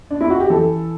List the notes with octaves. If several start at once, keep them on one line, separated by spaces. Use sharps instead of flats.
D4
E4
F#4
G4
E3 A4